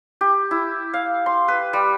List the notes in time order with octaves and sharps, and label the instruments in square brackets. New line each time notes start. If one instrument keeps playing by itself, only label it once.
[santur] G4
E4
F5
C6
B4
G3